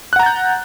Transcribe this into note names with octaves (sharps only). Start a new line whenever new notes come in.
F#5 A#5 F#6 G6 A6